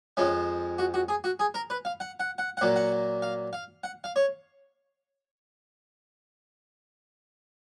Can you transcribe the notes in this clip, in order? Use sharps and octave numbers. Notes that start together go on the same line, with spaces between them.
F2 F3 G#3 C#4
F#4
F#4
G#4
F#4
G#4
A#4
B4
F5
F#5
F#5
F#5
A#2 F#3 A#3 F#5
F#5
F5
F5
F#5
F5
C#5